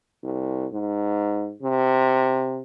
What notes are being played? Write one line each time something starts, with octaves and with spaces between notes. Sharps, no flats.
C2
G#2
C3